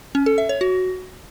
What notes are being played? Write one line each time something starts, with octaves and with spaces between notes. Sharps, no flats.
C#4
A4
E5
C#5
F#4